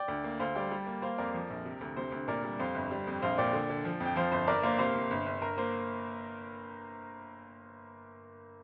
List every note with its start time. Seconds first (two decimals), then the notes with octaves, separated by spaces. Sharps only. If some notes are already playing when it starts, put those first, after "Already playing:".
Already playing: D5 G5
0.08 D2
0.24 A#3
0.40 D2 C5 F5
0.55 G3 D5 G5
0.71 G3
0.87 A#3
1.02 A#3 C5 F5
1.18 F2 A#4 D5
1.34 F3
1.50 A#1
1.65 C3
1.81 D2
1.97 C3 C5
2.12 D2
2.28 A#2 A#4 D5
2.44 G3
2.60 F2 C5 F5
2.75 G1
2.91 G3
3.07 F2
3.22 A#1 C5 F5
3.38 A#2 D5 G5
3.53 D3
3.70 D3
3.85 F3
4.00 F2
4.06 G5
4.16 F3 C5 F5
4.32 G1 C5
4.47 G1 A#4 D5
4.63 A#3 C5 F5
4.79 C3 C5 F5
4.95 C3
5.11 G1
5.26 G1
5.42 G1 A#4
5.58 A#3 C5